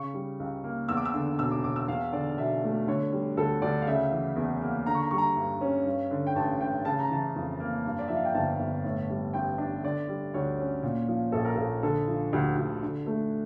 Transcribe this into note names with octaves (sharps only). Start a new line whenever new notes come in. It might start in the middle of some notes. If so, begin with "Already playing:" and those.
Already playing: C#3 C#6
G3
C#2
A#3
E2 E6
D6
E6
D3
E1 E6
D6
E1 D6
E6
E2 F5
D3 D5
E1 E5
A3
D3 C#5
G3
D2 A4
D2 D5
F5
C#3 E5
E3
E2
A#3
D3 A#5
C#6
A#5
G3 C#6
A#5
G2
C#4
G2
D3
G5
A1 A5
A1 G5
C#3 A5
A#5
E3 A5
F2
A#3
G2
D5
F3 E5
F5
G5
G1 A5
G1
A2
G3
A1 G5
D4
D3 D5
G3
D2 C#5
C#4
A#2
F3
A#1 A4
A#4
A#1 A4
D3 A4
F3
D2 G4
D2
D3
A3